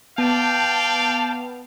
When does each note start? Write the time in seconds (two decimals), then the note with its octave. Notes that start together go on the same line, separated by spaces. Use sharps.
0.18 B3 D5 F5 G5 A5